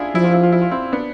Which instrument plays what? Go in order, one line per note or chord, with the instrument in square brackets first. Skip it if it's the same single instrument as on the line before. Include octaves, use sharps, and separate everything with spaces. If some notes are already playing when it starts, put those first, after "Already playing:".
Already playing: [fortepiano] D4 E4 F4 G#4
[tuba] F3 [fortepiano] E4
[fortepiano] F4
E4
F4
E4
F4
C4 E4
B3 D4